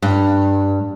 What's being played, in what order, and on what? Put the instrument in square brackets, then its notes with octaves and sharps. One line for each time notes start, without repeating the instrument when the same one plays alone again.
[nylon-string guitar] G2